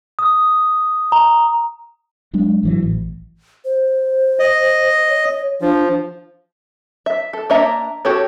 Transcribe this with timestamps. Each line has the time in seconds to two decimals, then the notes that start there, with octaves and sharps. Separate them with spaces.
0.19 D#6
1.12 A#5
2.33 F#3 G#3 D4
2.63 G#1 E3 F#3
2.82 A1
3.65 C5
4.39 D#5
5.09 C#5
5.61 F3 D4
7.06 E5
7.33 A4
7.50 A#3 D4 D#5 E5 A#5
8.05 F#4 G4 A4 C#5